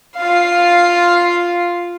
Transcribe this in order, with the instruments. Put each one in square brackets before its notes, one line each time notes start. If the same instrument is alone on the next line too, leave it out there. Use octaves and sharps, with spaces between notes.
[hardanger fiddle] F4 F5